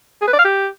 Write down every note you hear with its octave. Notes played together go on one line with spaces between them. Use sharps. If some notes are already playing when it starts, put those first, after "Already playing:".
G#4
B4
D5
F5
G4